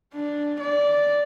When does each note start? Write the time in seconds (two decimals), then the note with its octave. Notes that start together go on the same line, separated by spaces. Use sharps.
0.14 D4
0.60 D5